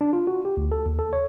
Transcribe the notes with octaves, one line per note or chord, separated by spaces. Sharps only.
D4
F4
F#4
G4
D2
A4
D#2
A4
C#5